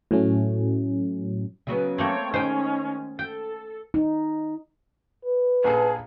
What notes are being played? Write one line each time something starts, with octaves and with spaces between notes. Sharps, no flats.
A2 F#3 A3 C#4
C#3 F#3 B3
A3 A#3 C4 A4 C#5 G5
D#3 G#3 C#4 D#4 C5 G5
A4 G5
D#4
B4
A#1 G#4 A4 A5